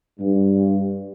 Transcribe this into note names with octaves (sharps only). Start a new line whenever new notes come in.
G2